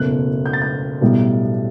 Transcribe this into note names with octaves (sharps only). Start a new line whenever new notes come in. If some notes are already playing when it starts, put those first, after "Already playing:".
Already playing: F#1 E2 B2 A3 F#6
G6
A6
G6
B1 A2 G3